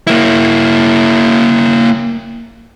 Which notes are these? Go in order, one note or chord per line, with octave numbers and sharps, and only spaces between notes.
A#3 E4